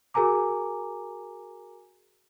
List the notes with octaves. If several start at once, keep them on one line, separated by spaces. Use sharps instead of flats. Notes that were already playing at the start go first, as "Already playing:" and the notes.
F#4 G#4 A#4 G#5 A#5 D6